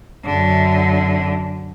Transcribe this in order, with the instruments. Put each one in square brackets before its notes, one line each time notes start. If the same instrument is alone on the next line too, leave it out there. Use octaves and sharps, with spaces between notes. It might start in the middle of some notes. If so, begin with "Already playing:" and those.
[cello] F#2 D3